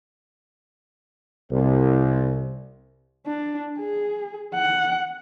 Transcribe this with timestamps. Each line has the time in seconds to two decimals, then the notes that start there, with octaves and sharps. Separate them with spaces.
1.50 C2
3.26 D4
3.79 G#4
4.55 F#5